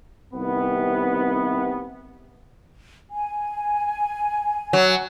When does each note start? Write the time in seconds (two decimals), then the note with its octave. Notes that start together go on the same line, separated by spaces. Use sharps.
0.34 C2 C3 D#3 B3
3.10 G#5
4.73 F#3